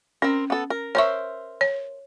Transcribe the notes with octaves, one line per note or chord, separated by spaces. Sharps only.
C4 C#4 A#4
B3 A4
A#4
A#4 C5 C#5 E5 C#6
C#5